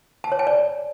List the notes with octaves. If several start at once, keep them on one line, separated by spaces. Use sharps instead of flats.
A5
C#5
G#5
D5